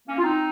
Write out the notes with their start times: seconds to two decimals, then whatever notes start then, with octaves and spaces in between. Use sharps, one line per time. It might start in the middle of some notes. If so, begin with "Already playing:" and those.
0.08 A#3 C#4
0.18 F4
0.23 C4 D#4